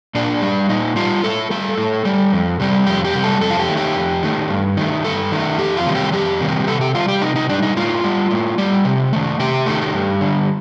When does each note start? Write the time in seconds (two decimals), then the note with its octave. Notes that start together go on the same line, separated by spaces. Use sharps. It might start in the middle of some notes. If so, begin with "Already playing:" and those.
0.15 A#2 D4
0.41 G3
0.69 A#2 D#4
0.96 G3 F4
1.24 A2 A4
1.50 G3 A4
1.78 A2
2.05 G3
2.32 F2
2.60 C3 G3
2.87 F2 G4
3.05 G4
3.14 C3 G3
3.24 A4
3.41 F2 A4
3.50 F4
3.59 G4
3.68 D#3 A3
3.77 G4
3.96 F2
4.23 D#3 A3
4.50 G2
4.77 D#3 A3
5.04 G2 A4
5.32 D#3 A3
5.58 F2 G4
5.77 F4
5.86 C3 D#3 G3
5.95 G4
6.13 F2 G4
6.40 C3 D#3 G3
6.68 C3 A4
6.81 G4
6.95 G3 F4
7.08 G4
7.22 C3 D#4
7.36 D#4
7.49 G3 D4
7.63 D#4
7.77 A2 F4
8.04 G3
8.31 A2
8.58 G3
8.85 C3
9.13 D#3 A3
9.40 C3 G4
9.66 D#3 A3
9.94 G2
10.21 D3 G3